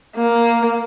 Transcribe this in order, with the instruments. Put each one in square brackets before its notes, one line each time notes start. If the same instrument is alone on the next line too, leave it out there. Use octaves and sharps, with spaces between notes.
[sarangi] A#3